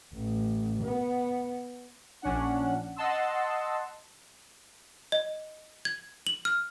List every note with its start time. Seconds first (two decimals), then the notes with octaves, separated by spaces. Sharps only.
0.14 A1
0.83 B3
2.22 A#1 C#4 D4 F#5
2.96 D#5 F#5 A5 C6 E6
5.12 D#5
5.85 G#6
6.27 F#7
6.45 F6